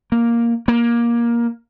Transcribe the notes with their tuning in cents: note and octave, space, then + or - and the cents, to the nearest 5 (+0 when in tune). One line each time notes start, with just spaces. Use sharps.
A#3 +5
A#3 +15